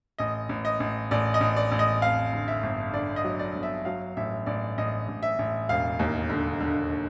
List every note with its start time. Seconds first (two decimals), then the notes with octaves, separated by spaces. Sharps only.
0.18 A1 D#5
0.49 A1
0.65 D#5
0.80 A1
1.11 A1 D5
1.34 D#5
1.41 A1
1.56 D5
1.72 A1
1.79 D#5
2.02 F2 F5
2.33 D3
2.48 E5
2.63 G1
2.93 D3 D5
3.16 D#5
3.24 F#3
3.39 D5
3.55 G1
3.63 E5
3.85 F#3 F5
4.17 A1 E5
4.46 A1 D5
4.78 A1 D#5
5.08 A1
5.23 E5
5.39 A1
5.69 E1 F5
5.99 D#2
6.30 D3
6.61 D3